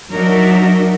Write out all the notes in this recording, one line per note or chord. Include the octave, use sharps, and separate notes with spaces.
F#3 D4 D#4 F#4 A#4 E5